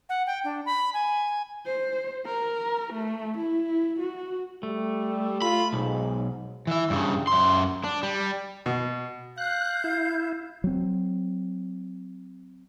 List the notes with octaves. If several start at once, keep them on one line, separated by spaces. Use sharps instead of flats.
F#5
G5
D4
B5
G#5
C5
A#4
A3
E4
F#4
G3 A3
F4 B5
B1 G#2
E3 E5
G2 C#3
F#2 C6
D4
G3
B2
F5 F#6 G6
E4
F#3 C4